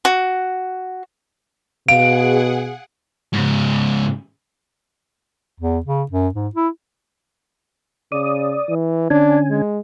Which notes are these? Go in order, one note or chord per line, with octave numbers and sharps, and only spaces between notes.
F#4
B2 G#4 F5 F#5 D7
G#2 C#3
E2
C#3
F#2
G#2
E4
C#3 D5 D#6
E3
D3 C#4 D4 G#5
G#3